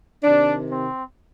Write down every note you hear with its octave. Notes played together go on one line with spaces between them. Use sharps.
C3 D#3 D4
C4